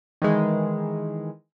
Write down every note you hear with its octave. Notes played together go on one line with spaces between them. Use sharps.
D#3 E3 G#3